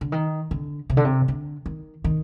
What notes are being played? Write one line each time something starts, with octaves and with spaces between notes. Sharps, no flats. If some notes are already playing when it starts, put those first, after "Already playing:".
D3
D#3
D3
C3
D3
C3
D3
D#3
D#3